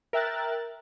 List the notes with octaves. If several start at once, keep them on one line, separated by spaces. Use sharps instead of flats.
A#4 E5 G5 F#6 A6